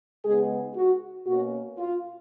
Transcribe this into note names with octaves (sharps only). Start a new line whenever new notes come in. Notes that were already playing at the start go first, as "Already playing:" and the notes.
C#3 G#3 B3 D#4 G#4
F#4
B2 A#3 C#4 F#4
F4